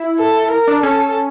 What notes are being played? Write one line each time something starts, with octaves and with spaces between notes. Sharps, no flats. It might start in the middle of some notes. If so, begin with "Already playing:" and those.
Already playing: E4
A4
A#4
D4
C#4 A4